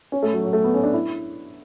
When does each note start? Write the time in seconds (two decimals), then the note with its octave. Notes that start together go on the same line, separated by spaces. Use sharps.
0.12 C#4
0.23 A3
0.33 F#3
0.43 F#3
0.53 A3
0.64 B3
0.74 C#4
0.83 D4
0.94 E4